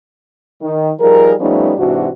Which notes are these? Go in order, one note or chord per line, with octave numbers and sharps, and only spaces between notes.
D#3
F3 G3 D#4 G#4 A#4
F3 G3 A3 B3 C#4 D#4
G#2 C3 E3 D4 F#4